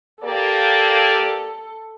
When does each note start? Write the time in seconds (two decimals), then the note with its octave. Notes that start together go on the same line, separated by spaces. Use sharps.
0.23 A#3 G4 A4 D5